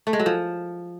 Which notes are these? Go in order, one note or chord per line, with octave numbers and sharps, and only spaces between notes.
A3
G#3
F#3
F3